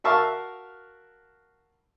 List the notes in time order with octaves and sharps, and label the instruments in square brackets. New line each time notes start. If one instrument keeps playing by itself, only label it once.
[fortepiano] F#4 A#4 E5 F5 A5 C#6